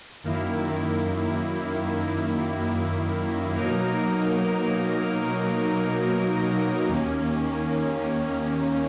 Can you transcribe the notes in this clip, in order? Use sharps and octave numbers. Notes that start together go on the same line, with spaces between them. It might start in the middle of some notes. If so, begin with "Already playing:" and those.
F#2 D#3 A#3 E4
B2 F#3 A#3 D#4 A#4
D#2 D#3 A#3 C#4